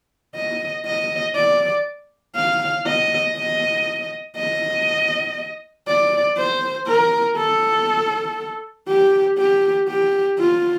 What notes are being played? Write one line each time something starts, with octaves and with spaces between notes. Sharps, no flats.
D#5
D#5
D5
F5
D#5
D#5
D#5
D5
C5
A#4
A4
G4
G4
G4
F4